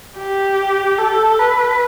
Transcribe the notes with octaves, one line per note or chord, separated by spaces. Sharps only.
G4
A4
B4